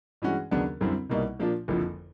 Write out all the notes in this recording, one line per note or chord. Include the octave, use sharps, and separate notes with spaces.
G2 E3 G#3 C#4 F#4
D#2 C#3 F#3 B3 D4
F#2 D3 G3 C4 E4
C2 B2 G3 A#3 D#4
A#2 F3 A#3 D4 F4
F#1 F2 D3 F3